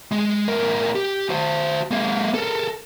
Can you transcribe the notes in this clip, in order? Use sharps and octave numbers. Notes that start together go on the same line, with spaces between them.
G#3
A2 A#4
G4
F#4 C5
G#3 A#3
A4 A#4